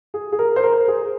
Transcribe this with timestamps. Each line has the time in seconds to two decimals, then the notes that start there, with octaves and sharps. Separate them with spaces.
0.14 G#4
0.32 G#4
0.39 A#4
0.56 C5
0.63 A#4
0.88 G#4